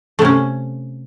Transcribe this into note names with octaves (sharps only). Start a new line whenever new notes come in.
C3 A3 C#4